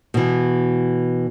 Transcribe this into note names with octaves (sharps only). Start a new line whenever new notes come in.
B2 E3